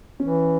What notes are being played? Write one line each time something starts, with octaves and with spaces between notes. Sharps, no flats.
E3 C#4